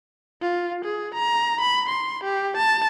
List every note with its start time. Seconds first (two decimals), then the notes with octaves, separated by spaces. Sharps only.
0.42 F4
0.85 G#4
1.15 A#5
1.61 B5
1.89 C6
2.24 G4
2.57 A5